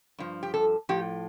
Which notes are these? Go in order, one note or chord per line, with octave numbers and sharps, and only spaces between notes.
G2 F3
G4
A4
A2 F3 G4